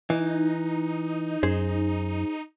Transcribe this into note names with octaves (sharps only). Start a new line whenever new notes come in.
E3 D#4
F#2 G#4 C5